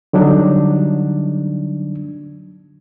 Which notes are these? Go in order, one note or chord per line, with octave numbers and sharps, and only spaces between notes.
D3 F#3 G3 D4 D#4